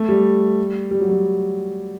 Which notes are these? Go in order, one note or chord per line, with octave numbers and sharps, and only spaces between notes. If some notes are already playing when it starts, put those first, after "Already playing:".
Already playing: A3
G3
G3
F#3
G3